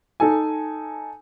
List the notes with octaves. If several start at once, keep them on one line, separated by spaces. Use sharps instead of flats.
D#4 A4 G#5